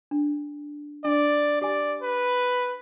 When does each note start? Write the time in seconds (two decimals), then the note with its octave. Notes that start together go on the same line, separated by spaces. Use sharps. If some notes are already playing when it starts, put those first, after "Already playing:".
0.11 D4
1.05 D4 D5
1.62 G4 D5 G#5
2.02 B4